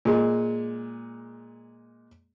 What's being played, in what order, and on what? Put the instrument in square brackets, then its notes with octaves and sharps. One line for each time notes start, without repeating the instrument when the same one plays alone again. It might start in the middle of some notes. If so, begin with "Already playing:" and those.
[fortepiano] A#2 G#3